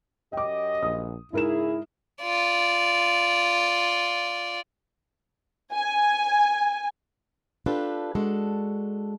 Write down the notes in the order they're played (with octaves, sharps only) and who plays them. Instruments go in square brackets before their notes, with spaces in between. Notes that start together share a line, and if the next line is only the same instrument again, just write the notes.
[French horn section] F#2 G4 D#5 [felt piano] G5 D6
[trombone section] A#1 [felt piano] D#6
[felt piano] G#2 A#4 E7 [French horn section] C#3 G#4 [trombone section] E4
[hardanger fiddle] F4 D5
[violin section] G#5
[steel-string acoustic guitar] D4 F4 G4 A4 B4
G#3 D4 F#4 A4